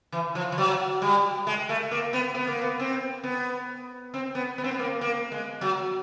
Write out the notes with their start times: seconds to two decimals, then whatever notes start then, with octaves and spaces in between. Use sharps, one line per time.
0.12 E3
0.35 F3
0.52 F3
0.58 F#3
1.02 G3
1.47 G#3
1.69 A3
1.91 A#3
2.13 B3
2.35 B3
2.48 A#3
2.62 B3
2.80 C4
3.24 B3
4.14 C4
4.35 B3
4.58 B3
4.64 C4
4.71 B3
4.79 A#3
5.01 A#3
5.32 G#3
5.61 F#3